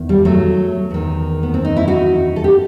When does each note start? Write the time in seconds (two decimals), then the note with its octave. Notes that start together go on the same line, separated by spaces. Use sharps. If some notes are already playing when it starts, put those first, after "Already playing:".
Already playing: E2 D#3
0.09 G3
0.25 F#3 A3
0.91 E2 D#3
1.43 B3
1.54 C4
1.65 D#4
1.76 E4
1.88 D#4 F#4
2.36 A4
2.44 G4